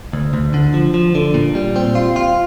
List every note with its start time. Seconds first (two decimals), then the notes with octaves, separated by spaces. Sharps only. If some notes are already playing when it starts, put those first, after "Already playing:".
0.13 D2
0.34 D2
0.54 D3
0.74 F3
0.94 F3
1.15 D3
1.34 A#2
1.55 G3
1.76 C4
1.95 F4
2.16 F4